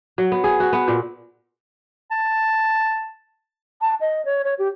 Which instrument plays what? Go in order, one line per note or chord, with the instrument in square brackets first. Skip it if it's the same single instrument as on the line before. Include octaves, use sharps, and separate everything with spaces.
[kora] F#3
B3
G#4
F#4
B3
A#2
[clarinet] A5
[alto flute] A5
D#5
C#5
C#5
G4